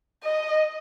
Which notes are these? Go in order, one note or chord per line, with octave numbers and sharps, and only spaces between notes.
D#5